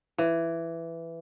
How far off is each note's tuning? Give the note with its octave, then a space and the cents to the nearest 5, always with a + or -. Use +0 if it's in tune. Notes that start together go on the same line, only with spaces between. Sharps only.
E3 +10